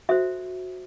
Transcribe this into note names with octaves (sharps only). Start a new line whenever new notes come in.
F#4 A4 C5 E5